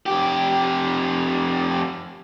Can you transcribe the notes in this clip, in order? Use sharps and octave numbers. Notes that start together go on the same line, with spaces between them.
F2 G4